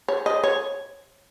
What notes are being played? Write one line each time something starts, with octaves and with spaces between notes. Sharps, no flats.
C#5
D#5
C#5